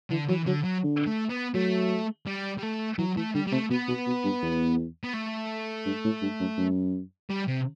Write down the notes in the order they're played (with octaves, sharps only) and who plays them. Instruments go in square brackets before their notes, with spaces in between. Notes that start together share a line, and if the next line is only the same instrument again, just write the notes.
[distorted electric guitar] D3 [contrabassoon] E3
[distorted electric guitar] E3 [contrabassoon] F#3
[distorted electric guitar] D3 [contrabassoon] F#3
[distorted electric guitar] F#3
[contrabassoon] D3
[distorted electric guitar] A3
B3
[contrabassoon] F#3 [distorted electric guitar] A3
[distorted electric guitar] G3
G3
A3
[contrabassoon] E3 [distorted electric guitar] F#3
[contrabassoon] E3 [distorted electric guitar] A3
[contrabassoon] D3 [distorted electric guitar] G3
[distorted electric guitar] G3
[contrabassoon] C3 [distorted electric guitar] A3
[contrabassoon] B2 [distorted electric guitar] B3
[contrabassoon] B2
B2
G2
E2
[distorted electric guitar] B3
A3
[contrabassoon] G2
A2
G2
F#2
F#2
[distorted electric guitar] G3
C3